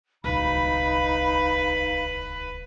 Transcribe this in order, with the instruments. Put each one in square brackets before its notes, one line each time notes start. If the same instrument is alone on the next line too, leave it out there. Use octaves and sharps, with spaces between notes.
[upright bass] D1 C2 [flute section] D#4 F5 B5 [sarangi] B4